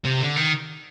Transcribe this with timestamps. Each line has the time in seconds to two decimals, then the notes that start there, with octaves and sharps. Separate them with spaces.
0.05 C3
0.21 D3
0.36 D#3